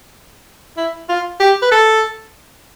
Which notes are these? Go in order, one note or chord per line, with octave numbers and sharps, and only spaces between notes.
E4
F4
G4
B4
A4